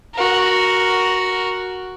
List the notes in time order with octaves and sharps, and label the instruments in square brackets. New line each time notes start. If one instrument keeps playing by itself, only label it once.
[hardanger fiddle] F#4 A#4